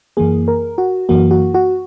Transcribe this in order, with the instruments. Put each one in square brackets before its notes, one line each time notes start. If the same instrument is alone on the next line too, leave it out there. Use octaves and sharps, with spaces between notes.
[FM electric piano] F#2 E3 A#3 G#4
A#4
F#4
F#2 E3 A#3 F#4
F#4
F#4